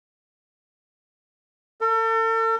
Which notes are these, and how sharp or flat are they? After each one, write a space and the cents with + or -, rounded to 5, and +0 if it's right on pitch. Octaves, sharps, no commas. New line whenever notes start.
A4 +40